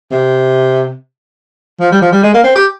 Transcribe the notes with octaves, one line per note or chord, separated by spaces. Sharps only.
C3
F3
G3
F3
G3
G#3
A#3
C4
G4